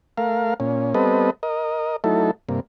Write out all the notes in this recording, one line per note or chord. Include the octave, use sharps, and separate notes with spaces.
A3 A#4 F5
A#2 C#4
G3 B3 C4 A4 B4 D#5
A#4 D#5
F#3 A3 D#4 E4 A4
G2 C3 A#3